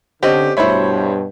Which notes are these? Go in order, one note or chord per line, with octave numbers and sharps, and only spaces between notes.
D3 C4 C#4 G4 D#5
G2 B2 A3 E4 C5 C#5 B5